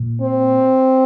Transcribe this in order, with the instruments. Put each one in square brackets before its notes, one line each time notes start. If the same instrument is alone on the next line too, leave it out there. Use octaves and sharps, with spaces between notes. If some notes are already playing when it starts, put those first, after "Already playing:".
Already playing: [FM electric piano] A#2
[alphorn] C4